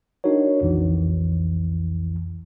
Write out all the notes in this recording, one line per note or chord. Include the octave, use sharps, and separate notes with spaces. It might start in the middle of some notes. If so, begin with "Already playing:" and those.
D4 D#4 F#4 A#4 C#5
B1 F2 E3